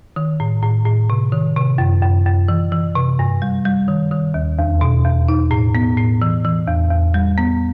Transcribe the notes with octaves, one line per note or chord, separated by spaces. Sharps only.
D#3
A2
A2
A2
C3
D#3
C3
F#2
F#2
F#2
E3
E3
C3
G2
G3
G3
D#3
D#3
D#2
E2
B2
E2
D#4
A2
B3
A2
E3
E3
E2
E2
G3
B3